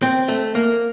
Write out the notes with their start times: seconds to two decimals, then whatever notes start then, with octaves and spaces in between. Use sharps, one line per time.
0.02 C4
0.28 A3
0.55 A#3